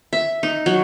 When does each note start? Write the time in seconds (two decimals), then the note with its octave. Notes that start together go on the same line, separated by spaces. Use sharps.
0.13 E5
0.43 D#4
0.66 F#3